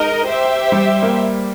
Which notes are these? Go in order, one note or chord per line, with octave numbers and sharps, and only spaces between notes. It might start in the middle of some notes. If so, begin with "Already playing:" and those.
Already playing: G#3 D#4 A#4 D#5
G4 C5 E5
G3
A#3